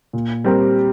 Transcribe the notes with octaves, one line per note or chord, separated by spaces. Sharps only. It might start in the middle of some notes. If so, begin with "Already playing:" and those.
A#2
G3 C4 G4 A#4